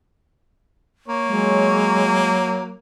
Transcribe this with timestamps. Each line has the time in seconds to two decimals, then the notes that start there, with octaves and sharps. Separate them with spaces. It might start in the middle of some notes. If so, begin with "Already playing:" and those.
1.08 A#3 C#5
1.28 F#3 G#3